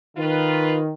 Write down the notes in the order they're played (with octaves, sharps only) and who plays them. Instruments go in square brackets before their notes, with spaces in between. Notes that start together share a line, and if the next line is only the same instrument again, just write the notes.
[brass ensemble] D#3 [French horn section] F4 B4